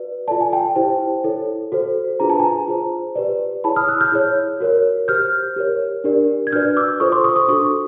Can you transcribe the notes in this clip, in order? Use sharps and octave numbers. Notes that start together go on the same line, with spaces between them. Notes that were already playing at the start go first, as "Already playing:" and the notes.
Already playing: F#4 B4 D5
F4 A4 D5 A5
G#5
G5 A5
E4 G4 C5
E4 A4 C#5
F#4 A4 C5
D4 F4 G#4 B4 A#5
A5
G#5 A#5
F4 G#4 C5
G4 B4 D5
E4 G#4 C#5 A5 B5
D#6 F6
E6 F#6
F6 G6
E4 G#4 C#5
F#4 A#4 C#5
G4 C5 F6 G6
G4 A#4 C#5
D4 G4 A#4 D5
G#6
D4 F#4 B4 D5 F6 G6
D6 E6
F4 A4 C5 C#6 D#6
C6 D6
C#6 D#6
C#6 D#6
D4 F#4 A4 C#6 D#6